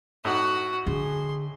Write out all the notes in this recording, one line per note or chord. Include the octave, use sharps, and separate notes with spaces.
A2 D#4 F#4 F#5
D3 G#4 C6